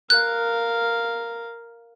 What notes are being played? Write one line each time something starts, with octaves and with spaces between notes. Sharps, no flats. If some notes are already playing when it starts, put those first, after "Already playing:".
A#4 F5 F#6